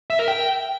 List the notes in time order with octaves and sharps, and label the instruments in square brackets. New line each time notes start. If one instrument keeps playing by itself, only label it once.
[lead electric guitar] E5
A#4
G5